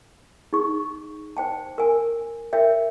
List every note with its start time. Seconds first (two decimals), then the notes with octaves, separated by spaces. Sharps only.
0.53 D#4 G#4 C#6
1.37 C5 G5 A5
1.78 A#4 G#5
2.53 A#4 C#5 E5 G5